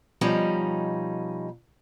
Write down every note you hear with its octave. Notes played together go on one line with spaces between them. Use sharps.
B2 F3 G3 C#4 D#4